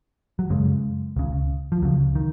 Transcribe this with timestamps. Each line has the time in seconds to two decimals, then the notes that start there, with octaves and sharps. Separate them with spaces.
0.39 F#3
0.50 F#2 C#3 G#3
1.16 C#2 C#3
1.72 F3
1.82 C#2 C#3 F#3
2.15 D#3